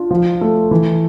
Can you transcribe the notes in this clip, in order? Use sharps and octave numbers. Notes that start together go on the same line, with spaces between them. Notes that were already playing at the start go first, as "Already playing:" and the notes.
Already playing: D4 F4
F3
A3
E3